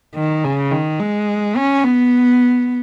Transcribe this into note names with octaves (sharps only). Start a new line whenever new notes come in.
D#3
C#3
D#3
G#3
C#4
B3